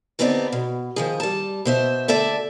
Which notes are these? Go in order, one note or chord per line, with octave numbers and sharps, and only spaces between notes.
D#2 D3 B3 C4 D#4 D5
B2
D#3 F3 G#4
G3 A5
B2 C5 E5
D2 D3 A4 D5 E5 A5